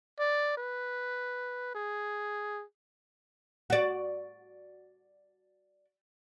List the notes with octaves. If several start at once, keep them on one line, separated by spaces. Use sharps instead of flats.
D5
B4
G#4
F#4 D5